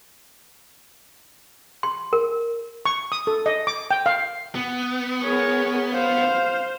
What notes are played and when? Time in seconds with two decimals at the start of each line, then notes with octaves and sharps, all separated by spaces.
1.83 C6
2.13 A#4
2.86 C#6
3.12 D#6
3.27 A4
3.46 D#5
3.67 D6
3.91 G5
4.06 F5
4.55 B3
5.23 G#4 A#4 C#5
5.94 C5 F5